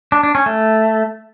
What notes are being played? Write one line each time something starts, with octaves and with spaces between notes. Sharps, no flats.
D4
D4
C#4
A3